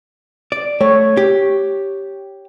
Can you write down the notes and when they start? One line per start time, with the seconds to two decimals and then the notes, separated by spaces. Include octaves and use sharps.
0.52 D5
0.81 A3 C#5
1.17 G4